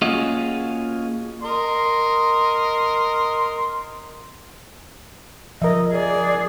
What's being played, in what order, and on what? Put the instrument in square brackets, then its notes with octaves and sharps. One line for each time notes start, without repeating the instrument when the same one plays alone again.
[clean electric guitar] A#3 C#4 F4 F#4 G#4 D#5
[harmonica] A#4 D#5 C6
[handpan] F3 [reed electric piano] A#4 E5 [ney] D#5
[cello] G#4 [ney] D5